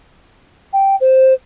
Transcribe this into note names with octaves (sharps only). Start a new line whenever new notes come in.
G5
C5